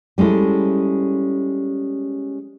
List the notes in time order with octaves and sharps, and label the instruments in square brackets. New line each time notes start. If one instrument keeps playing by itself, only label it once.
[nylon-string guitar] G3 G#3 C#4 E4 A4